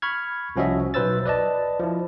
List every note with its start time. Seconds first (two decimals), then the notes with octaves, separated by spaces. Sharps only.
0.02 B5 C#6 F6 G#6
0.56 C2 F3 C#4 F#4 D#5 E5
0.94 B1 F#3 B4 C5 E6 A6
1.25 B4 D5 D#5 A5
1.79 F3 E4